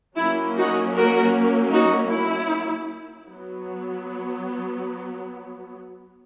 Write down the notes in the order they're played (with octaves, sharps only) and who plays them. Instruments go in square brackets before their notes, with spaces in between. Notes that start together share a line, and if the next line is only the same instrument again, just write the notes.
[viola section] F#3 A#3 C#4 E4
D#4 F#4
F#4 A#4
D#4 F#4
E4
F#3 B3